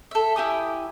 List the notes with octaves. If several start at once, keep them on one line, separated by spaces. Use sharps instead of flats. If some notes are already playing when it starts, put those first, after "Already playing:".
A4 E5
E4 G4 G#5 D#6